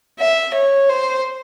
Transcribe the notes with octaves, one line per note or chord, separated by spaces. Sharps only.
E5
C#5
C5